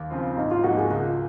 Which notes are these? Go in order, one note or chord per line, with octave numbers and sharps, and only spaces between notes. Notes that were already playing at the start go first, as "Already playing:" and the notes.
Already playing: D#2
C#3 F3 C4 F4
G#1 D#4
F4
G#2 F3 A#3 D#4 F#4
G#4
C#2 F4